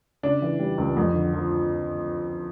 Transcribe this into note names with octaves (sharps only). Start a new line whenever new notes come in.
C#3 D4
E3
G3
C#2
F2
D3
F3